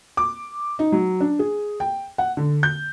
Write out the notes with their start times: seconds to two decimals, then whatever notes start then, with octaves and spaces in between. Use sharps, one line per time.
0.17 D6
0.79 D#4
0.92 F#3
1.20 D4
1.39 G#4
1.80 G5
2.18 F#5
2.37 D3
2.63 G6